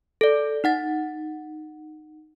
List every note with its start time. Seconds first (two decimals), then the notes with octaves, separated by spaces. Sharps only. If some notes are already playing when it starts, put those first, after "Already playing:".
0.21 A4 D5
0.64 D#4 F#5 A6